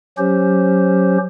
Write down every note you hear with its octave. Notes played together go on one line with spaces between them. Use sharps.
F#3 C#4 G4 C5